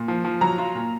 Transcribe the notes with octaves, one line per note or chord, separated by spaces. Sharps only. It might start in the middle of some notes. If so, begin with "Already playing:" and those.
Already playing: A#2
F3
F3
F#3 A#5
F4
A#2